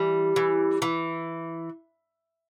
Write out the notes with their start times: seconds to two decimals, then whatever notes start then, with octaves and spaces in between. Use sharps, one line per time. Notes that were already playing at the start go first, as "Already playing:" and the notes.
Already playing: E3 G3
0.36 E3
0.82 E3